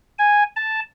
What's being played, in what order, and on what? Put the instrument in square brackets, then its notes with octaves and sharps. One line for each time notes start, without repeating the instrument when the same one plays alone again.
[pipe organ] G#5
A5